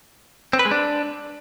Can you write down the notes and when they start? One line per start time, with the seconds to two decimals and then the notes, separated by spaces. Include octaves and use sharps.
0.53 C4
0.59 B4
0.65 G#3
0.71 D4